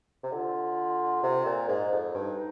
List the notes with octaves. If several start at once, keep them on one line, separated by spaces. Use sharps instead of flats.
C3
D3 F4
C3
A#2
G#2
F2
G2 D#4